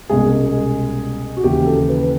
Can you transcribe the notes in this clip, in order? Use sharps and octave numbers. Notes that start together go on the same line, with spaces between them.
C2 B2 G#3 C#4 G#4
F#4
D#2 C#3 E3 G4
A4
B4